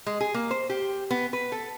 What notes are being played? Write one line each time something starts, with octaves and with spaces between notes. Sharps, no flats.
G#3
G#4
A#3
C5
G4
B3
B4
A4